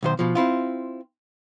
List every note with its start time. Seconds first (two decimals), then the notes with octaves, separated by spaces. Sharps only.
0.03 B1 D#3 C5
0.19 B2 F3
0.35 C4 E4 F4